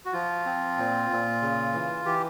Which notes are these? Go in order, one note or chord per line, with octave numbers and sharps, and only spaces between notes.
F#4
F3 F4
C4
A#2
A#2
C#3
E3
E3 G4